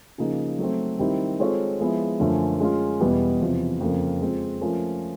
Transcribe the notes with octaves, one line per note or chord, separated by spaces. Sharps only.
C#3 F3 A#3 D#4 G#4
F#3 A3 C4
D#3 G3 C4 E4 G4
G#3 C4 F4 A4 C#5
F3 G#3 B3 E4
F#2 D3 F3 A3 C#4
G#3 C#4 F4
E2 B2 G3 B3
E2 C3 F3
F2 C#3 F3 A#3
G#3 C4 F4
F3 A3 C#4 F4 A#4